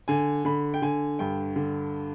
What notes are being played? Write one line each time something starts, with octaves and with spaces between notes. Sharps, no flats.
D3 G#5
D3 B5
G5
D3 G#5
G2 G5
D3